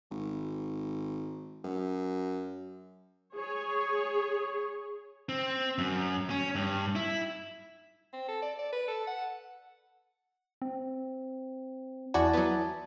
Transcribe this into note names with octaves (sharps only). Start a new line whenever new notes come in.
G#1
F#2
G#4 C#5
C4
F#2
C#4
G2
E4
C4
A4
D5
D5
B4
A4
F#5
C4
E2 E4 F#4 D5 G#5 A5
F#3 B3